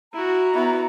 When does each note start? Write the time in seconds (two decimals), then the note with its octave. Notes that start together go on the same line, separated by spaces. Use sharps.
0.13 E4 F#4 A#5
0.55 B3 E4 F#4